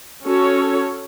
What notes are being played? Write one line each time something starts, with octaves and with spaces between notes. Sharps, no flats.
C#4 F#4 A4 C#5